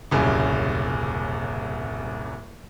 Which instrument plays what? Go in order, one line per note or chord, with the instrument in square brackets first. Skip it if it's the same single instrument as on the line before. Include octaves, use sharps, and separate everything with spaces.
[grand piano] D#1 C2 F#2 C#3